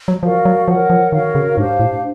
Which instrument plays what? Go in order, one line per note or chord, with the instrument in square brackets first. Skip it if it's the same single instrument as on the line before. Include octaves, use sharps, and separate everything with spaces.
[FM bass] F#3
[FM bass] F3 [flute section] F#4 A#4 D5 F5
[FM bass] F#3
[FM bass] F3 [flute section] A#4 C#5 F#5
[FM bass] F3
[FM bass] D#3 [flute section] F#4 A#4 C#5 F5
[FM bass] C#3
[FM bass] G#2 [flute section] D4 G4 C5 F5
[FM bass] A2